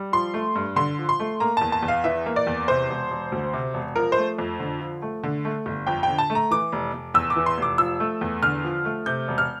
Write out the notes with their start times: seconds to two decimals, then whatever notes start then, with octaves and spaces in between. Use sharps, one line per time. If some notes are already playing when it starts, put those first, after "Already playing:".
Already playing: G3
0.12 F3 C6
0.34 A3
0.55 G2
0.76 D3 C6
0.99 F3
1.09 C6
1.20 A3
1.40 A#3 A#5
1.57 E2 A5
1.72 A5
1.83 E2
1.88 F5
2.04 E3 E5
2.26 A#3
2.36 D5
2.47 E2
2.68 C3 C5
2.89 E1
3.11 E1
3.32 D2
3.53 C3
3.74 E1
3.96 F3 A#4
4.12 C5
4.18 A3
4.38 F2
4.60 D3
4.81 F3
5.02 A3
5.24 D3
5.45 A3
5.66 G1
5.87 F2 G5
6.03 D3 G5
6.18 A5
6.30 A3
6.35 A#5
6.51 E3 D6
6.72 F1
6.93 F1
7.14 E2 E6
7.30 D6
7.36 E3
7.46 C6
7.58 F1 D6
7.78 F3 E6
8.00 A3
8.21 E2
8.43 D3 F6
8.64 F3
8.85 A3
9.06 C3 G6
9.28 E1
9.38 F6